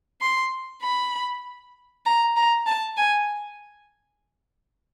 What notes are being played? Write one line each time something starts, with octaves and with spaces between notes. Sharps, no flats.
C6
B5
A#5
A#5
A5
G#5